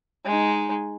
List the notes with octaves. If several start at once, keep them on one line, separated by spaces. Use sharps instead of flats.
G#3 D#4